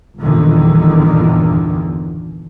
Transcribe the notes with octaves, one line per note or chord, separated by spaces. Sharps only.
G1 E2 A#2 D3 D#3